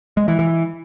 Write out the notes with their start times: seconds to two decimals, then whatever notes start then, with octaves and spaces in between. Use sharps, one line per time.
0.17 G#3
0.28 E3
0.39 E3